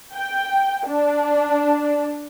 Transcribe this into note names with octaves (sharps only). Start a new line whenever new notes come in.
G5
D4